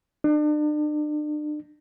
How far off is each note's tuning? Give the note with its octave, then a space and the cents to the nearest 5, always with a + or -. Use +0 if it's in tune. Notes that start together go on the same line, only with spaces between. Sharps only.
D4 +40